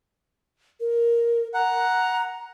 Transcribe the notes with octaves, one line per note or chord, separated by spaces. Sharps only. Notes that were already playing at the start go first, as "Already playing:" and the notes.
A#4
F#5 A#5